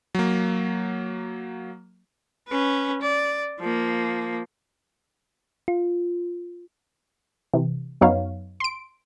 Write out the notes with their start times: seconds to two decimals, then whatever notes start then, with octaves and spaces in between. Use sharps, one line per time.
0.15 F#3 A#3
2.48 C#4 B4
3.01 D5
3.60 F3 A#3
5.68 F4
7.54 C3 E3
8.01 F#2 F#3 B3 D#4 C#5 F5
8.60 C6 D7